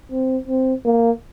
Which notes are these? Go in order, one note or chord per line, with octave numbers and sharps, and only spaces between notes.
C4
C4
A#3